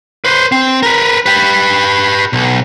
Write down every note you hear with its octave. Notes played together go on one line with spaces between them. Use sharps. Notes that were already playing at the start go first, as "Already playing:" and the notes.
B4 C5
C4
A#4 B4
G4 B4
B1